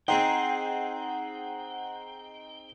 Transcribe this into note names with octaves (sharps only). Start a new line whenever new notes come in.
C4 D#4 G#4 C5 F#5 G5